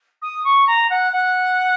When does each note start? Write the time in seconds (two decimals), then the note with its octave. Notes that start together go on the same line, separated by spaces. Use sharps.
0.22 D#6
0.44 C#6
0.67 A#5
0.90 F#5
1.12 F#5